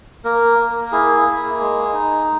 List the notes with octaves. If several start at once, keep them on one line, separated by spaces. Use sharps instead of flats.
A#3 A#4
A#3
A#4
E4 G#4
A#3
G#3
D#4